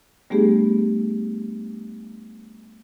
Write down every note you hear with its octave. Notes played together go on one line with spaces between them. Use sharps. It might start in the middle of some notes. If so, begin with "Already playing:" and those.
G3 A3 B3 D4 G4 G#4